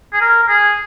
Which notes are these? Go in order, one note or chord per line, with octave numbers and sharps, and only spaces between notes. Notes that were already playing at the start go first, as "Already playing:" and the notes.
G#4
A#4
A#4
G#4